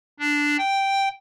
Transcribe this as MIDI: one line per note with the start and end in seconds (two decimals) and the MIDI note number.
0.19 0.57 62
0.58 1.09 79